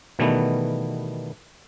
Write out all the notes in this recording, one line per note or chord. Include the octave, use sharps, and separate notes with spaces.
B2 D#3 E3 G3 A3 B3